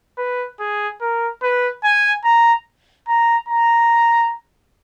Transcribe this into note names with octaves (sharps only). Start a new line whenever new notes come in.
B4
G#4
A#4
B4
G#5
A#5
A#5
A#5